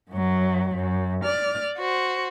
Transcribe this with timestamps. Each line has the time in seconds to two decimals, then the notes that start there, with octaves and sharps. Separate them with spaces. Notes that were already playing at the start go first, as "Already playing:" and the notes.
0.11 F#2 F#3
0.76 F#2
1.25 D5 F6
1.78 F#4 C5